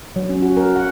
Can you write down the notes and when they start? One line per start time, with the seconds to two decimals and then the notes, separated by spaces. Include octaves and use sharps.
0.16 F#3
0.30 C#4
0.42 F#4
0.57 A#4
0.76 F#5